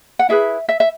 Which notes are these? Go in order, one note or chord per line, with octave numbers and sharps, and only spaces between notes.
F#5
E4 G#4 B4 E5
E5
E5